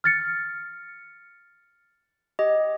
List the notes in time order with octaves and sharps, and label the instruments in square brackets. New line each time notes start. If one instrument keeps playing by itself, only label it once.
[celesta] F6 A6 C#7
[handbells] G4 D#5